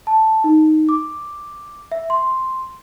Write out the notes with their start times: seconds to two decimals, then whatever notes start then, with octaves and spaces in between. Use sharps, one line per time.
0.07 A5
0.44 D#4
0.89 D6
1.92 E5
2.10 C6